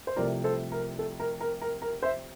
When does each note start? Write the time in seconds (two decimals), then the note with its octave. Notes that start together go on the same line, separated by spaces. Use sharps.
0.07 C5
0.16 C2 C3 F3 A3 A#4 D5
0.44 A4 C5
0.72 A#4
0.99 A4
1.20 A#4
1.41 A#4
1.62 A#4
1.82 A#4
2.02 C5 E5